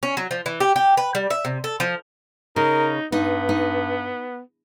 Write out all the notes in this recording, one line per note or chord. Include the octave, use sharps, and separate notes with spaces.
C#4
F#3
F3
E3
G4
G4
B4
G3
E5
C3
A4
F3
C#3 D#4 A#4
G2 B3 D#4
D#4